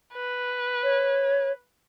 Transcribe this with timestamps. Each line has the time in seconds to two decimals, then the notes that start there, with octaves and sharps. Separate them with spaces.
0.13 B4
0.83 C#5